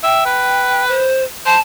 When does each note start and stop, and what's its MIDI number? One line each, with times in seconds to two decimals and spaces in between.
0.03 0.24 76
0.03 0.87 79
0.26 1.06 71
0.88 1.24 72
1.46 1.56 72
1.46 1.60 81